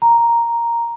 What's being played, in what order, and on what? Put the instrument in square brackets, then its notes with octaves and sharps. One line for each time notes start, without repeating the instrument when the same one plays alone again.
[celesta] A#5